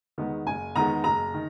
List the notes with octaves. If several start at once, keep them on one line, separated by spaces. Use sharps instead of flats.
E2 D#3 G#3 B3
F#1 G#5
E2 D#3 G#3 B3 A#5
F#1 A#5
D#3